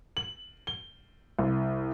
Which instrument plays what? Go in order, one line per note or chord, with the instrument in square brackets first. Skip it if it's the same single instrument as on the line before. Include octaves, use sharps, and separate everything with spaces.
[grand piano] F#7
G7
C2